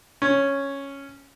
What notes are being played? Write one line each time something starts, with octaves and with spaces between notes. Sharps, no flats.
C#4